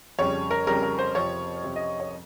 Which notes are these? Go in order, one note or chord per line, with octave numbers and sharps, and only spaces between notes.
F2 C#3 G3 C#5
A#4
F2 C#3 G3 A#4
A#4
C5
F2 C3 F3 C#5
F2 C3 F3
D#5
C#5